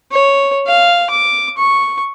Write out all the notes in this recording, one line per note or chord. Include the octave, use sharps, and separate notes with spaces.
C#5
F5
D6
C#6